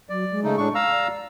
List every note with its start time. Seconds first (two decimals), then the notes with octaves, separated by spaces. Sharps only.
0.09 F#3 D5
0.31 G#3
0.44 C#3 A3 D#4
0.58 A2 D4 C#6
0.75 F5 A#5 E6
0.91 D5